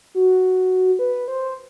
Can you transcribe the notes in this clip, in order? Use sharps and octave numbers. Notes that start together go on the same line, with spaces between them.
F#4
B4
C5